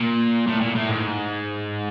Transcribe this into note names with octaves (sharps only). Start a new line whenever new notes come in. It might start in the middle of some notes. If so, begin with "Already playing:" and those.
Already playing: A#2
A2
A#2
A2
G#2